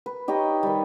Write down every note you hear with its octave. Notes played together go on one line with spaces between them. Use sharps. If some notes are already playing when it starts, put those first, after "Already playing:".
B4
D#4 G4 C#5 D#5
D#3 G3